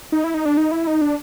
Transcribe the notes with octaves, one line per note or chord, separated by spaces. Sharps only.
D#4
E4
D#4
D4
D#4
E4
D#4
D4